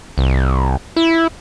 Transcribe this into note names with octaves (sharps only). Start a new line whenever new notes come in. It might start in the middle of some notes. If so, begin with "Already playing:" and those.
C2
E4